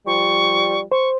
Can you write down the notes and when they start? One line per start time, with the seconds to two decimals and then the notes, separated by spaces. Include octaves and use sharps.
0.07 F3 G3 C#6
0.92 C5 C#6